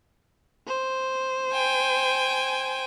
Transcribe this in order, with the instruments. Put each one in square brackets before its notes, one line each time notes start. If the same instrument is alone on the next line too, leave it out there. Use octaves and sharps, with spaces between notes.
[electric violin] C5
[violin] G5 G#5